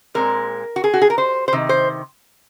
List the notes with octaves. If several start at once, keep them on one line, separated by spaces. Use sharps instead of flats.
A#2 G#3 C4 A#4
F#4
G#4
F#4
G#4
A#4
C5
C5
C3 D#3
C5